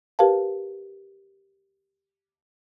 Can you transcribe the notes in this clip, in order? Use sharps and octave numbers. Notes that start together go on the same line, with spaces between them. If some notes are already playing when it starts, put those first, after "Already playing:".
G4 A#4 B4 F5 A5